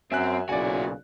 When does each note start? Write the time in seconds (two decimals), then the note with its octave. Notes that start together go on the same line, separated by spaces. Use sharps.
0.12 F#2 C4 E5 G#5 F#6
0.49 B1 A#2 C#3 E4 F#4 D5 G#5